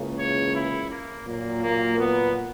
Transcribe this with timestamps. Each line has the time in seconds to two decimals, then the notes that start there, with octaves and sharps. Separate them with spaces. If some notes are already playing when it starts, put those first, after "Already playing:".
Already playing: C#2 C#3 E3 A#3
0.18 C#5
0.54 E4
0.90 A#3
1.26 A#2 F#3 A#3
1.63 A#3
1.98 B3